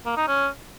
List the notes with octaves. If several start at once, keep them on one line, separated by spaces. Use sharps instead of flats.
A#3
D#4
C#4